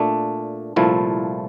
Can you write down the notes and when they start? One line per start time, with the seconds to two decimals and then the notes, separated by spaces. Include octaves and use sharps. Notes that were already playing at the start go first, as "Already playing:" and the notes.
Already playing: A#2 A3 D4
0.76 C2 A#2 F3 A3 E4